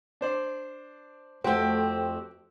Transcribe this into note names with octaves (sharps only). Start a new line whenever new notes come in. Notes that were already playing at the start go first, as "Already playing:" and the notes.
D4 C5 D5
F2 A3 C4 F#4 G4 C5